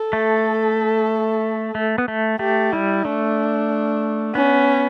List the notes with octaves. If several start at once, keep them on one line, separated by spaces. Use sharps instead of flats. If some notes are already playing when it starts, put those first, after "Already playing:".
Already playing: A4
A3
A3
B3
A3
A3 G4
G3 E4
A3 D4
B3 C#4